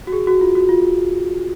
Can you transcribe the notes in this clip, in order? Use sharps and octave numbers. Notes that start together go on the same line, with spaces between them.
F#4
G#4
F#4
F4
F#4
F4